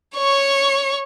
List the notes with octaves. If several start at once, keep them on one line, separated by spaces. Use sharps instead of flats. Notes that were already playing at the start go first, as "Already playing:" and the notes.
C#5 C#6